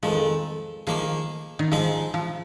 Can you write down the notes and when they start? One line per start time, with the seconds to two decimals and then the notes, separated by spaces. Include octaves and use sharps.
0.03 F2 D#3 F3 G#3
0.87 D#3 F3 A#3 G#4
1.59 D#3
1.71 G#2 F3 G#3 D#4 G#4
2.14 F3